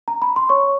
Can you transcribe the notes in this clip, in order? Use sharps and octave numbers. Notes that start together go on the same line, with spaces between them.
A#5
B5
C6
C#5 C#6